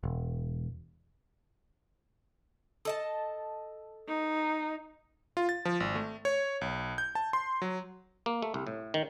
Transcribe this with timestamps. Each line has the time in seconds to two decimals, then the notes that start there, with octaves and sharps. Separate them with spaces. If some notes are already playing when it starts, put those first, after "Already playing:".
0.03 E1
2.85 A4 D#5 A5
4.08 D#4
5.37 F4
5.49 A6
5.65 F3
5.80 G#1
5.95 A3
6.25 C#5
6.61 B1
6.98 G6
7.15 A5
7.33 C6
7.62 F#3
8.26 A#3
8.42 A3
8.54 C2
8.67 A2
8.94 D#3